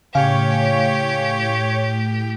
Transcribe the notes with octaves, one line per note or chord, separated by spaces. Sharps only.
A2 C#3 G4 C#5 F5 G#5